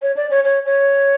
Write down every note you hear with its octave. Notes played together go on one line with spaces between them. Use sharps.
C#5
D5
C#5
C#5
C#5